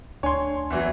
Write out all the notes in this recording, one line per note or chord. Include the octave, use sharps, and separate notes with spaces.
D2 D4 C#5 G#5 C6
E2 E3 F#3